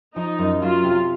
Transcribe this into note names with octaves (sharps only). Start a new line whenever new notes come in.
F3 D#4
F#2
F#3 F4
C3